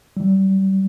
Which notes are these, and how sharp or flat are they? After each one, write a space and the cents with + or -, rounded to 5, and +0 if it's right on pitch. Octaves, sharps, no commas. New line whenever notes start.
G3 -30